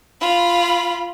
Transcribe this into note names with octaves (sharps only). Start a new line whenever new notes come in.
F4 B5